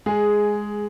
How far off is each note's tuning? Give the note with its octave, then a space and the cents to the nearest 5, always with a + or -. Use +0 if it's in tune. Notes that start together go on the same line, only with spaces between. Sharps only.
G#3 +0 G#4 +5